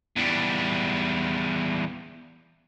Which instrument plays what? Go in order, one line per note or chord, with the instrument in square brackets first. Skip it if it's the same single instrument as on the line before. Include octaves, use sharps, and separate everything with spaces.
[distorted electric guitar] E2 G3